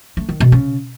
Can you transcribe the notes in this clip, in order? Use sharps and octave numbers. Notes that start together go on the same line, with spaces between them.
A3
D#3
B2
C#3